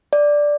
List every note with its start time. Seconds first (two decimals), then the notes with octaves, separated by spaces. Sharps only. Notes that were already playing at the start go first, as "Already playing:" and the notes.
0.13 D5